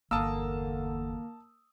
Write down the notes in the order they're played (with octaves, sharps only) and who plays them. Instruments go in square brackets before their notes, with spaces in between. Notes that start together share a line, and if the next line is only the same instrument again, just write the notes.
[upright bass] G1 E2 [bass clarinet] D3 [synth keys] A#3 [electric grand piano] A5 D#6 E6